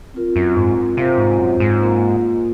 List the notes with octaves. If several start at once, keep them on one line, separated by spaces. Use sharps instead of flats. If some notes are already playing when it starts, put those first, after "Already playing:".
C4 F4 A#4
F#2
G#2
C3 C4 F4 C5 F5
G#2
F#2
G#2
A#3 F4 A#4